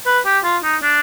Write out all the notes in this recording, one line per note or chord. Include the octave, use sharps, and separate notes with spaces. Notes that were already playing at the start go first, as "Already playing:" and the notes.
B4
G4
F4
D#4
D4